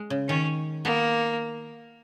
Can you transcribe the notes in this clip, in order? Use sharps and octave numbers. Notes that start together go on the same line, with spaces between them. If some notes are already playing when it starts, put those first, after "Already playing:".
Already playing: G#3
C#3
D#3 C#4
A#3 B3